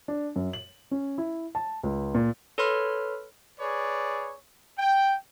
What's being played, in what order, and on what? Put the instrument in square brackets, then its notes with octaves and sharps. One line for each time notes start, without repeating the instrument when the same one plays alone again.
[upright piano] D4
F#2
F#7
C#4
E4
A5
C#2
A#2
[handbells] A4 B4 C#5 B5 C6 F6
[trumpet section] G#4 B4 C#5 D5
G5